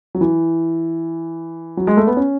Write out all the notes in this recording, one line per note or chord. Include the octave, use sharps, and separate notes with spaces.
F#3
E3
F#3
G#3
A3
B3
C#4